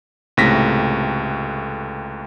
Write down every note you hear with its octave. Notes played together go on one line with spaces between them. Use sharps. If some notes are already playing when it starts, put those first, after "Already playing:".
C#2 A2 C3 A3 A#6 B6